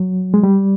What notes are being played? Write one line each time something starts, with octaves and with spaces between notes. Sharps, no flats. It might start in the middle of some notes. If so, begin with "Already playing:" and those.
Already playing: F#3
G#3
G3